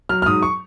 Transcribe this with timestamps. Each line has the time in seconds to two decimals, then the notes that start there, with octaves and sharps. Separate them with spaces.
0.09 F#3 F6
0.22 F6
0.26 G#2 D#6
0.42 C#6